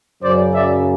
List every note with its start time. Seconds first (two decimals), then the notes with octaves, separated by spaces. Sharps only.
0.23 F#2 C#3 F#3 C5 D5
0.53 D5 E5